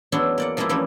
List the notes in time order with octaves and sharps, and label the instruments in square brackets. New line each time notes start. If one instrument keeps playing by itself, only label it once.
[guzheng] E2 F#3 B3 D4 E4 C6
A#3 D5 F#5
F3 G#3 A#3 C4 E4 G4
E3 F3 G3 A3 A#3 C#4